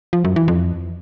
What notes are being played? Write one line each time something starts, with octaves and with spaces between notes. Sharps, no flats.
F3
F#2
E3
F2